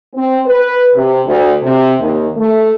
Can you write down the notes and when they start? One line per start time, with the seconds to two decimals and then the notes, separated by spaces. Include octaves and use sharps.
0.14 C4
0.46 B4
0.94 C3
1.26 D2
1.63 C3
2.00 D#2
2.37 A3